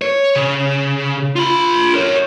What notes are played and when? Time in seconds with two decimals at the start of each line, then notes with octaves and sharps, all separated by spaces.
0.02 C#5
0.36 C#3
1.36 F4 B5
1.94 A#4 C#5